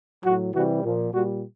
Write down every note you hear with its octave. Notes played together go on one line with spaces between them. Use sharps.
A2 F#3 F#4
C3 E3 G3 F#4
A#2 F3
A#2 G3 F#4